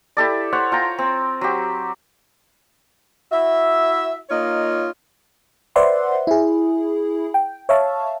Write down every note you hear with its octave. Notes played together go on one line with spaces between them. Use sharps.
E4 G4 A4 D5
C5 C#5 F#5
F4 G5 A#5
C4
F#3 G4
E4 F#4 E5
A#3 D#4 F4 C#5 D#5
B4 C5 D5 E5 F#5 C6
E4 G#4
G5
C#5 E5 F5 A5